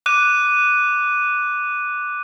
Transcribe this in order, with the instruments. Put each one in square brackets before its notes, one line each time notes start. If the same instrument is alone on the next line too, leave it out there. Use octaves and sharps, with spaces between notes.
[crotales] D6 F#6 D#7